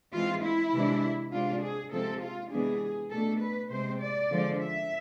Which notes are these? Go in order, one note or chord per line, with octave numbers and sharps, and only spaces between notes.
E3 G#3 C4 F4
E4
C3 E3 G#3 D4
C3 G#3 D4 F4
G#4
C3 F3 G#3 C4 A4
F4
C3 E3 G#3 B3 D4 G#4
B2 A3 D4 A4
B4
C3 G#3 C4 C5
D5
D3 F3 G#3
E5